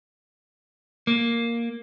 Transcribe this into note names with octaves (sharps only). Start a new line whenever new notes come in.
A#3